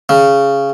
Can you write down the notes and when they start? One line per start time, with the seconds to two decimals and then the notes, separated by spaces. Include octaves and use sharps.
0.09 C#3